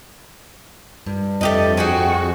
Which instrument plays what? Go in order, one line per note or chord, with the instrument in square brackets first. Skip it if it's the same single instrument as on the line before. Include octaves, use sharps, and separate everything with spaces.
[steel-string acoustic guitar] G2
[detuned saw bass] F2 [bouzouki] A3 G4 D#5
[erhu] F#4 [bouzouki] G#4 G5 G#5